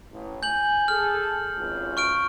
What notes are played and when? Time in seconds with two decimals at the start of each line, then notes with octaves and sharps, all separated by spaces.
0.11 A1
0.43 G#5 G6 F#7
0.88 G#4 A4 F6
1.56 G#1 C#2
1.97 C#6 F6 D7